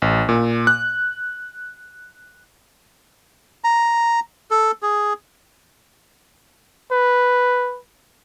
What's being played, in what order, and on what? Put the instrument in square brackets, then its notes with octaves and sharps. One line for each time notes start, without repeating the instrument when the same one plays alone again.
[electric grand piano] A1
A#2
F#6
[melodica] A#5
A4
G#4
[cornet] B4